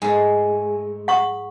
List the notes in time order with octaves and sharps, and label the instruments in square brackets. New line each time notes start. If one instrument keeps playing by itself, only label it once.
[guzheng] G#2 [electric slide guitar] G#3 A3 [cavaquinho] G#4 A5 B5
[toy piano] F#5 C#6 D#6 [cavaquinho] B5